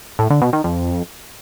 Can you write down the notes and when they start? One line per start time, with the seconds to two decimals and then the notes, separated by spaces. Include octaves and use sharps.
0.19 A2
0.30 D3
0.42 B2
0.53 D#3
0.64 F2